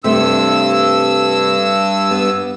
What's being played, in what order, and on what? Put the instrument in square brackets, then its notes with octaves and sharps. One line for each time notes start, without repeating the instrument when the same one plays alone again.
[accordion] G2 E6 [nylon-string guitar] C3 A3
[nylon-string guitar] B3